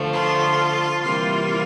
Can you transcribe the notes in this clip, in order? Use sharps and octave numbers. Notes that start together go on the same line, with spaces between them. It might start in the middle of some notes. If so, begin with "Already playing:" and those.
Already playing: D3 F3 A3
F4
C3 E3 G3 A#3 F4